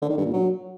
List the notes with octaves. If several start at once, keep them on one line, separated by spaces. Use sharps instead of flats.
D3
D#3
G2
A#2
F#3